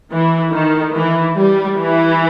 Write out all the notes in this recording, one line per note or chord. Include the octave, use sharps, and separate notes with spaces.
E3
D#3
E3
G3
E3